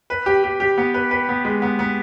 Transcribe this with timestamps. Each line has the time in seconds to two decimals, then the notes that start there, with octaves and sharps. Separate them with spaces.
0.10 B4
0.26 G4
0.44 G4
0.60 G4
0.78 B3
0.94 B4
1.11 B4
1.29 B3
1.45 G#3
1.62 B3
1.79 B3